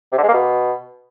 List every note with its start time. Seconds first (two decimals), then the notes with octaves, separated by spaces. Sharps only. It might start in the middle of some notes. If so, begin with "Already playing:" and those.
0.12 C3
0.18 D3
0.23 G#3
0.28 A#3
0.34 B2